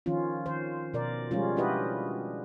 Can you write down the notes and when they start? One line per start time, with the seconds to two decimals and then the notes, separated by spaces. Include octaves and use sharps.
0.06 D#3 F3 C#4 F4
0.46 D#3 C5
0.94 B2 A#4 D5
1.31 F3 G3 G#3 C#4 F4
1.57 D4 E4 F#4 G4 B4 D#5